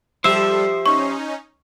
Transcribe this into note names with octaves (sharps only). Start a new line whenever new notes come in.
F3 G3 G4 A4 C5 E5 E6
C#4 D#4 C#6